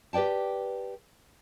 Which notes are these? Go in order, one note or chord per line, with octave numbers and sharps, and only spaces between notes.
G4 B4 D5 G5 A5